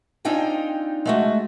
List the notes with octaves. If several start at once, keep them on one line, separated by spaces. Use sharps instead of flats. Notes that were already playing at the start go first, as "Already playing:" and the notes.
C4 D4 D#4 F4 G5 G#5
G#3 A3 F#4